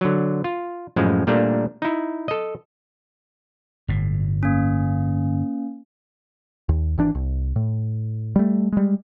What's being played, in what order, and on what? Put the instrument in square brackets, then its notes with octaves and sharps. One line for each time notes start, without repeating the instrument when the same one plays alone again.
[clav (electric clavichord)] D3 F#3
F4
F#2 A2 F3 G#3
A#2 G3 A3 A#3 D4
D#4 E4
A4 D#5
[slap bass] G1 A2
[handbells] A#3 C#4
[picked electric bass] D#2
G#1 E3 D4
C2
A2
G3 A3
G3 G#3